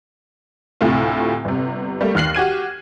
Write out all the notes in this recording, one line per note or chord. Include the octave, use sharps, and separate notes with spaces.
D2 A2 C3 A3 F4
G1 C3
G3 A3 A#3
D#2 F6 F#6 C7 F#7
F#4 G4 G#6 D#7